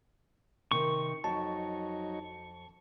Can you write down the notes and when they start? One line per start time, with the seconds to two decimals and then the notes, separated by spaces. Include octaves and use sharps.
0.71 C3 D#3 C#6
1.24 F2 F#3 D#4 A5